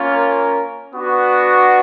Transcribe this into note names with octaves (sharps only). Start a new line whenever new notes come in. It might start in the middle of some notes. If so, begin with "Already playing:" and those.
Already playing: A#3 C#4 F4
A#4
B3 D4 F#4